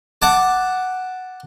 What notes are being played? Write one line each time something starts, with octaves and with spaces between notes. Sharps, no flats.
F#5 A5 D6